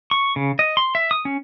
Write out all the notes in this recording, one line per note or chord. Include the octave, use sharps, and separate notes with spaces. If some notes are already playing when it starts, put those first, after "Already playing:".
C#6
C#3
D#5
C6
E5
D#6
C#4